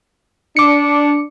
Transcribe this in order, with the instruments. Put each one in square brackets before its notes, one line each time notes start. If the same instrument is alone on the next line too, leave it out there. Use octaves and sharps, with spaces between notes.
[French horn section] D4 [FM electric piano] D6 C#7